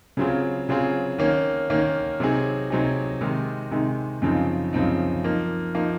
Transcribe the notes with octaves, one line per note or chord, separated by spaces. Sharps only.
C#3 F#3 C4 F4 G#4
C#3 F#3 C4 F4 G#4
D#3 A#3 C#4
D#3 A#3 C#4
C3 F#3 C4 D#4 G#4
C3 F#3 C4 D#4 G#4
C3 D#3 G#3 D#4
C3 D#3 G#3 D#4
F#2 C#3 F3 C4 D#4
F#2 C#3 F3 C4 D#4
F3 A#3 D#4
F3 A#3 D#4